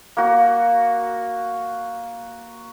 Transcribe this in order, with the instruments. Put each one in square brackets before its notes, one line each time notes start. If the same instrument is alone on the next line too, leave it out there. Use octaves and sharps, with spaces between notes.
[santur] A#3 F#4